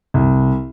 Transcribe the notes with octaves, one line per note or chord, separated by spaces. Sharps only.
C2